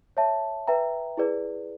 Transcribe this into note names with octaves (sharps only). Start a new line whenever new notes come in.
C#5 E5 A5
B4 E5 G5 A#5
E4 G#4 B4 D5